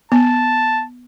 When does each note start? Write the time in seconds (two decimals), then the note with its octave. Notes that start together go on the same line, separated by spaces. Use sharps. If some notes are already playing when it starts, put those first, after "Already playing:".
0.12 B3 A5